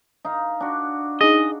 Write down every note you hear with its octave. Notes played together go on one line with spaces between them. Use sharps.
D#4 F5
D4 F#4
D#4 G#4 D#5